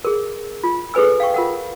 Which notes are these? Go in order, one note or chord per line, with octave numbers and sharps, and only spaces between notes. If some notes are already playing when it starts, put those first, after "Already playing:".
G#4 A#4
F4
G#4 A4 B4 G#5 E6
F5 G5 C#6
F4 A#4 F#5